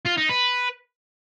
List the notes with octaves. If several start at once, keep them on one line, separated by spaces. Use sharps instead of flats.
F4
D#4
B4